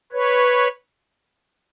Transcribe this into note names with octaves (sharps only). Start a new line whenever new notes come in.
B4 C#5